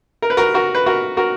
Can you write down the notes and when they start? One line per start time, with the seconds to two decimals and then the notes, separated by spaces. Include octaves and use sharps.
0.22 A#4
0.30 B4
0.37 F#4 A#4
0.54 F#4 A#4
0.75 B4
0.86 F#4 A#4
1.17 F#4 A#4